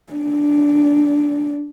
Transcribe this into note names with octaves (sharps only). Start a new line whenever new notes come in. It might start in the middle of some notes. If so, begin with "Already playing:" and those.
D4